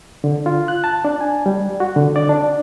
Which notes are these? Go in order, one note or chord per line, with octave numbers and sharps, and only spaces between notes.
D3
F4
F#6
A5
D4
G#5
G3
F#4
D3
D5
D4